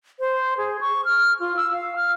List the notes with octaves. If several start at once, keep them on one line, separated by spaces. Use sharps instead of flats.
C5
G#4
C#6
F6
F4
E6
F5
F6